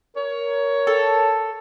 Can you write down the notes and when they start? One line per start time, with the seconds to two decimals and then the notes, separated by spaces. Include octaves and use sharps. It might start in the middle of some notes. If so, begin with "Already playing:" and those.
0.17 A#4 C#5
0.87 A4